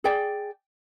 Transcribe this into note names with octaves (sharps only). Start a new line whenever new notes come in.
G#4 D5 G5